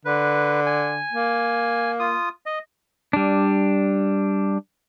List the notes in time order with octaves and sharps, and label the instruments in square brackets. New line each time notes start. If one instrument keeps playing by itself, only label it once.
[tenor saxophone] D3 [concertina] B4
[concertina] G#5
[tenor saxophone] A#3
[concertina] F4 D#6
D#5
[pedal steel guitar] G3 D4